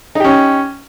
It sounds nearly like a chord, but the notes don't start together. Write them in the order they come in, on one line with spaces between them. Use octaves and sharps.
D#4 G4 C#4